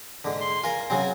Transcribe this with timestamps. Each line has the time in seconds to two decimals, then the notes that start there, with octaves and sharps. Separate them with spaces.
0.25 G#2 D3
0.41 C6
0.64 F4 A#4 G#5
0.90 C#3 F#3 C4 G#5